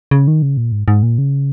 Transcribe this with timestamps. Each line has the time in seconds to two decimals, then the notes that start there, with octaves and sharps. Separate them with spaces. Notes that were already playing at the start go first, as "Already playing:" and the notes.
0.11 C#3
0.28 D#3
0.42 C#3
0.57 A#2
0.72 G#2
0.88 G#2
1.03 A#2
1.18 C#3